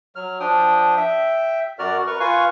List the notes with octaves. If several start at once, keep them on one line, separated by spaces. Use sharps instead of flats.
F#3 F6
F3 D4 G5 D#6
E5 G5
F#2 F#4 A#4 D5 F6
A#4 B4 A#5 C#6
F4 B4 F5 G#5 C#6